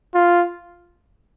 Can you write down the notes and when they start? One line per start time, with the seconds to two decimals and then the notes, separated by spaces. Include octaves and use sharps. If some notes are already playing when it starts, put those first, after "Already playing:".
0.14 F4